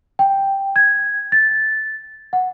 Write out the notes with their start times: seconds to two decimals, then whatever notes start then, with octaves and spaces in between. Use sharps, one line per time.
0.19 G5
0.76 G#6
1.32 A6
2.33 F#5